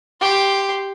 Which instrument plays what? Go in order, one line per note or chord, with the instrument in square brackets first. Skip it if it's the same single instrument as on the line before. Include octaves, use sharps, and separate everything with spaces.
[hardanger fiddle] G4 C6